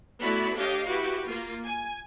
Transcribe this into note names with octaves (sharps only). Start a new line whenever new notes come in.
A3 B3 E4 F#4 D5 B5
D4 G4 C#5 D#5 F5
E4 F#4 G4 B4
A#3 F4
G#5